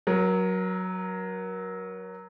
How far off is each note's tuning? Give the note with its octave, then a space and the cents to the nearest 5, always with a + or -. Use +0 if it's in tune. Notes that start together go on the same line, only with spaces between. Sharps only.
F#3 +0 A#4 +30